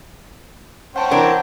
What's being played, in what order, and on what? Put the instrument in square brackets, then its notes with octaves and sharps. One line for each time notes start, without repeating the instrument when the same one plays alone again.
[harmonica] C#4 C5 G5 [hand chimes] F#5 A5
[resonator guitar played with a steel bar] E3 D4 A#4 [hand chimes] F#5